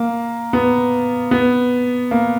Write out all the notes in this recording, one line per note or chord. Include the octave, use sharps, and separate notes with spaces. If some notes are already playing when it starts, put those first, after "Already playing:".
Already playing: A#3
B3
B3
A#3